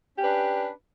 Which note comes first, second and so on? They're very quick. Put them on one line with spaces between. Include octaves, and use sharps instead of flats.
C#4 G4 B4 D4